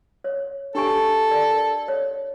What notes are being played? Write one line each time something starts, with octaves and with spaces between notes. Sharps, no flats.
C#5
D4 G4 A4 G#5
A#4 D5
C#5